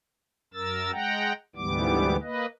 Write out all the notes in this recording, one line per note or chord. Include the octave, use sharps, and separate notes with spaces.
F#2 A#4 E6 A6
G#3 F#5 G5 A#5
D2 G#2 E3 G3 B3 D6
A#3 B4 D#5